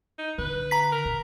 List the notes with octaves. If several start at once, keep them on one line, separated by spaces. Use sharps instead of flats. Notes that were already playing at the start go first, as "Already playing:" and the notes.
D#4
D3 B4
A#5 B6
A#4
B2